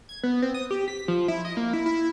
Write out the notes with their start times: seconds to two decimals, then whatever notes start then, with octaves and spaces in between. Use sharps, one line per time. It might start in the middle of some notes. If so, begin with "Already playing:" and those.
0.09 G#6
0.23 B3
0.42 C4
0.54 D#6
0.71 G4
0.88 B6
1.08 F3
1.28 E4
1.45 D#5
1.57 A#3
1.73 E4
1.86 E4